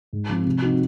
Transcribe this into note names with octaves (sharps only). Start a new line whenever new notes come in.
G#2
F3 C4
C3
F3 C4 D#4 F#4